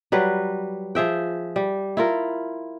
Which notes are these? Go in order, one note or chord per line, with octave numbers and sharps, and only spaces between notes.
F#3 G3 B4
F3 G#4 E5 G5
G3
E4 F4 A#4